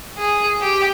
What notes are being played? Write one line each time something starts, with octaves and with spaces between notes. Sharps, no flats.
G#4
G4